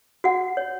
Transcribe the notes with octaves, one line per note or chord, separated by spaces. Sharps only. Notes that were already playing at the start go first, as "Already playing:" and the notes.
F#4 F#5
C#5